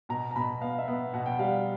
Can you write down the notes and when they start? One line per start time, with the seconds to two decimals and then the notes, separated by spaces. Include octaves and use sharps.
0.09 B2 A#5
0.31 A#5
0.36 B2 B5
0.61 B3 F5
0.79 E5
0.88 B3
1.14 B2 F#5
1.26 G5
1.32 F#5
1.39 G3 F5